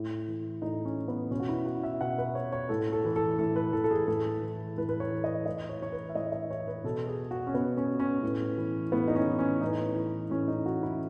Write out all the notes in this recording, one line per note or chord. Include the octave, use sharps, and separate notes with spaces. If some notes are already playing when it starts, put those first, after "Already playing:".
Already playing: A2
E3
A2 D#4
C#4
E3
B3
B2 C#4
F#4
E4
F#4
E5
B2 F#5
B4
C#5
C#5
A2 A4
A4
E3
A4
A2 A4
B4
E3 A4
A4
G#4
A2 A4
E3
A2 B4
B4
C#5
E3
D#5
A2 D#5
C#5
E3 C#5
B4
E5
A2 D#5
D#5
E3 C#5
B4
B2 A4
G#4
F#4
C#4
B2 B3
C#4
C#4
A2
E3
A2 B3
D#4
C#4
E3
C#4
A2 D#4
E3
A2 C#4
D#4
E3 F#4
E4